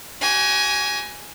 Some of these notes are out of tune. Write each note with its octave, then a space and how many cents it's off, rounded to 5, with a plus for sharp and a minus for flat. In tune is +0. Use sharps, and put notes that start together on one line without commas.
F#4 +45 G#5 +0